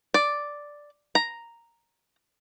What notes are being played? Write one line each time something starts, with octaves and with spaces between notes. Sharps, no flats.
D5
A#5